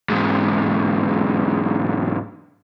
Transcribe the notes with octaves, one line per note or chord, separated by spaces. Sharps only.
E2 G#2